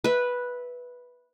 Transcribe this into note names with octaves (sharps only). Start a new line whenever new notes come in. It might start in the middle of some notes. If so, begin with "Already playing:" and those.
B4 E5